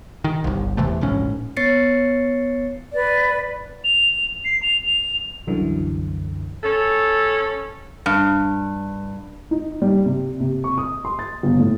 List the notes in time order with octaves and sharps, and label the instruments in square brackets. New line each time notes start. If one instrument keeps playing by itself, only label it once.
[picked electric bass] D#3
G1 C2
E2 C3 E3 A3
D1 A#1 G#2 C#4
[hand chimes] B3 C#5 A6 C7 C#7
[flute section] B4 D5
[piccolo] F7
C7
F7
F7
[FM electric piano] C2 F#2 D3 E3
[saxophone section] C#4 A4
[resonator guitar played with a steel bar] G2
[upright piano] D#4
G3
C3
C3
C#6
D#6
C6
A6
G1
A2